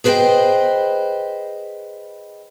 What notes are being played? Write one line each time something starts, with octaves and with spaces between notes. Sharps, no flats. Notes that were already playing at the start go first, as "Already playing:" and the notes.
G#4 B4 C5 D5 D#5 G5